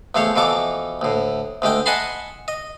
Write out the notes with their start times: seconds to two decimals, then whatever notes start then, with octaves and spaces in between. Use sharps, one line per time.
0.15 E2 F3 A3 C5 C#5
0.36 B2 E3 F3 A4 D6
1.01 D2 A2
1.62 D2 G#3 A3 G5
1.86 D#5 F#5 G#5 A5 B5 C6
2.48 D#5